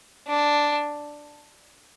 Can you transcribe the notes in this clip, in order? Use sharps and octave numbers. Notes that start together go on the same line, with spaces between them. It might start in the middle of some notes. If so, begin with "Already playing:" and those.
D4